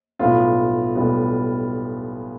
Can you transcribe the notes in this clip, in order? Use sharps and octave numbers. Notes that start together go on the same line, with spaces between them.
B1 A2 G3 B3 F4
B1 A2 G3 B3